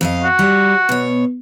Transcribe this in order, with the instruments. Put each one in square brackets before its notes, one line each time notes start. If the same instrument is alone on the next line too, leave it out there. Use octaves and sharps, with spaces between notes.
[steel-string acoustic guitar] F2 D#5 F5
[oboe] F#4
[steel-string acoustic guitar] G3
B2 C#5